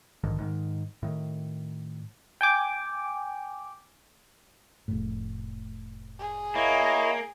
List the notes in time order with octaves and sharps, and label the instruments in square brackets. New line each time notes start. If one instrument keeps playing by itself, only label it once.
[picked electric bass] A#1 G#2 D3 D#3
G#2 D3 D#3
A2 D#3
[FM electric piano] G5 G#5 D6
[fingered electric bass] F1 A2
[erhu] G#4
[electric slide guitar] A#3 [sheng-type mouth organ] E4 C#5 D#5